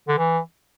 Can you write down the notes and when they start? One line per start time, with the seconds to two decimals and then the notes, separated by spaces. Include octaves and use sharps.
0.08 D3
0.18 E3